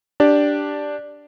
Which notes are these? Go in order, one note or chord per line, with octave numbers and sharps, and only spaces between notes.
D4 G4 D5